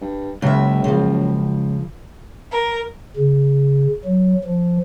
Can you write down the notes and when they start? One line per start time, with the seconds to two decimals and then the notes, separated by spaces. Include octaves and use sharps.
0.01 G2
0.42 F#1 C#2 C#3 E5
0.84 C#3 F3
2.49 A#4
3.16 C#3
4.05 F#3
4.44 F3